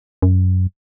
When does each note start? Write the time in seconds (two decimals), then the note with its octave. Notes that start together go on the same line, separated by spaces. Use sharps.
0.22 F#2